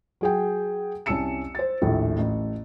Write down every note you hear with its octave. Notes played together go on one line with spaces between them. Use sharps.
F#3 G#4 G5
C2 C#4 A5 E6 C#7 E7
C5 A6
A#1 D#2 A2
A1